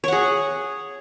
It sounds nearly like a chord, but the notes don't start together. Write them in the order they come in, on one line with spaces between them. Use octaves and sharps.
C#5 F#5 G#4